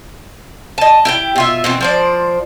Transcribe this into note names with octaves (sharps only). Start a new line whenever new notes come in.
D#5 A5
E4 G4 G5
B2 F4 E5
B2 E3 C4
F3 C5 D5